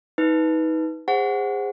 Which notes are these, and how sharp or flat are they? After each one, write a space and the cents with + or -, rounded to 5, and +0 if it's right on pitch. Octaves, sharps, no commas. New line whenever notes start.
D#4 +30 B4 +0
G#4 -30 C5 +0 F#5 +0